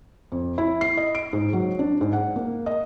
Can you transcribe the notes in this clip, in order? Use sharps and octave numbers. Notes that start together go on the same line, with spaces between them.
F2
E4
C7
D#5
D7
G#2
F#3
D4
G#2
F#5
A#3
D#5